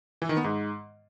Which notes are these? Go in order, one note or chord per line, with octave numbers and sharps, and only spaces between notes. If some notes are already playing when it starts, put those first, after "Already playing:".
E3
D#3
B3
G#2